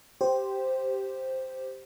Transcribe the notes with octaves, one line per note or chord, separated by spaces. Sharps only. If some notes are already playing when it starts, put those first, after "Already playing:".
G4 C5